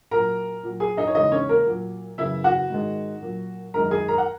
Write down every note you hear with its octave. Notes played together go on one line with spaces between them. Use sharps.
A#2 F#3 A#4 A#5
A#2 F#3
G#4 G#5
D#4 D#5
C#5
E2 C#3 G#3 D#4 D#5
C#4 C#5
A#3 A#4
A#2 F#3
F#2 C#3 E3 E4 E5
F#4 F#5
G#2 D#3 G#3
A#2 F#3
F#2 D#3 G#3 A#4 A#5
G#4 G#5
A#4 A#5
F#5